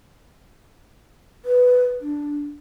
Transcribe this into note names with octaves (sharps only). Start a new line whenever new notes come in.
B4
D4